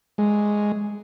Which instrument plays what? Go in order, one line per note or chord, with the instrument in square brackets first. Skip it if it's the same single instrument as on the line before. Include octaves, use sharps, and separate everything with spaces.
[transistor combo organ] G#3